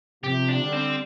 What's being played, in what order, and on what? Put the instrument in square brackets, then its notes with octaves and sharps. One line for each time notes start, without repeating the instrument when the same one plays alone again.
[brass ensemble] C3 F3 [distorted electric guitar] G4
[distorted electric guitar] D4
[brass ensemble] D3 G3
[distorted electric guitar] C4